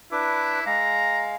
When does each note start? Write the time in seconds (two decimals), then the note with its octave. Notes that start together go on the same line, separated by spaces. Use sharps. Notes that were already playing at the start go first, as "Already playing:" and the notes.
0.12 D4 E4 B4 D6
0.66 G#3 F5 A#5